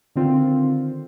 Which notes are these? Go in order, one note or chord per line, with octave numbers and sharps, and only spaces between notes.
D3 D#3 C4 F4